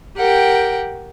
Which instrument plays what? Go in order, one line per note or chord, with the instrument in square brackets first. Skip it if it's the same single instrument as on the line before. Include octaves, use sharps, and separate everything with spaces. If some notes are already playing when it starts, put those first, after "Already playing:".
[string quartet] G4 A#4 F#5 G5